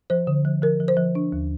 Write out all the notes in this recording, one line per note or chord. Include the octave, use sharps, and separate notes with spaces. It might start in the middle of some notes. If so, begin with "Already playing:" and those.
F3 C5
D3
F3
F3 A#4
F3
C5
F3
D4
D#2